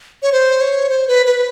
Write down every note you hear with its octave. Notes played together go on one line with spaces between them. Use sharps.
C#5
C5
C#5
C5
B4
B4